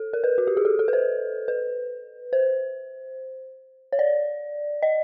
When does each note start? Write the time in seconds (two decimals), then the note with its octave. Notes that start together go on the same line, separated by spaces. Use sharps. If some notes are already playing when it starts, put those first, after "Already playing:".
Already playing: A4
0.13 A#4
0.24 B4
0.38 F#4
0.47 G4
0.57 G#4
0.65 A4
0.79 A4
0.88 B4
0.93 C5
1.48 B4
2.33 C5
3.92 C#5
3.99 D5
4.83 D#5